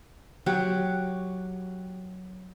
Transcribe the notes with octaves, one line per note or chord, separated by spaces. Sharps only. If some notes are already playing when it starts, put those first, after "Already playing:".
F#3 F#4 G4